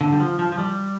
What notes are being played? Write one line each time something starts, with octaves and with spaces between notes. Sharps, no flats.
D3
G3
F3
F3
F3
G3